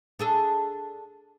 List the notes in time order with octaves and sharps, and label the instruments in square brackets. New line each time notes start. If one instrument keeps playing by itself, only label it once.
[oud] D4 G#4 A4